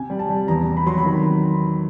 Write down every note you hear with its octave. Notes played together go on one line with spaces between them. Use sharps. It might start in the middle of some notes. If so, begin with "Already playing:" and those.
Already playing: C3 G#5
G3
A5
G3
E2 A#5
C3
B5
F#3 C6
B5
D#3